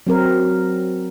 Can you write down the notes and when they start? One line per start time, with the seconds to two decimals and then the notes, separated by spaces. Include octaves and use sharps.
0.07 F#3 C4 A#4